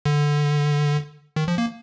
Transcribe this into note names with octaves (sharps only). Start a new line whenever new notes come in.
D3
D#3
F3
A#3